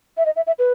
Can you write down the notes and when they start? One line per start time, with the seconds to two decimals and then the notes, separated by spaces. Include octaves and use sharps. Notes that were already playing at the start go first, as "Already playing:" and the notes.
0.17 E5
0.26 D#5
0.36 E5
0.47 E5
0.59 B4